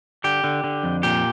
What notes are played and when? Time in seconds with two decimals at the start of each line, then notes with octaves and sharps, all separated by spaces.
0.24 D3 G4
0.44 D3
0.64 D3
0.83 F2
1.03 A#2 G4